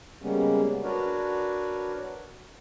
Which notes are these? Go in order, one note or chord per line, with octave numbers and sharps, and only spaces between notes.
C#3 G3 G#3 A#3 B3 C#4
D4 F#4 A#4 B4 C#5 D5